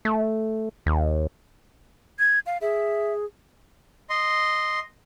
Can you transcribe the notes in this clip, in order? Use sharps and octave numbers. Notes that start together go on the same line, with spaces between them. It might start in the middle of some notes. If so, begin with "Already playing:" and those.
A3
D#2
G#6
F5
G#4 E5
D#5 C6